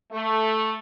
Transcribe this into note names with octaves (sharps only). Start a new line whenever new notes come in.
A3